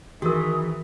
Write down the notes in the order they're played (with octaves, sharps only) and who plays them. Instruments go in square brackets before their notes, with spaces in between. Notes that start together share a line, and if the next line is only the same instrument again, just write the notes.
[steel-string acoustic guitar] D#3 [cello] E3 [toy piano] F#4 A#4 [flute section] G#4 C#6 D#6